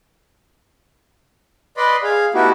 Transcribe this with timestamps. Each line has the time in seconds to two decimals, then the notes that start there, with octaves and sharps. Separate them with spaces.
1.77 B4 D5 D#5 B5 C6
2.03 G#4 F5
2.34 A3 B3 D#4 E4 F#4 G4